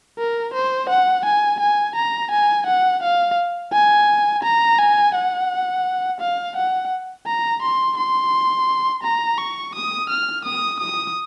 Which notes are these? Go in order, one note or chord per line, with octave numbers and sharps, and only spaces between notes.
A#4
C5
F#5
G#5
G#5
A#5
G#5
F#5
F5
G#5
A#5
G#5
F#5
F5
F#5
A#5
C6
C6
A#5
C#6
D#6
F6
D#6
D#6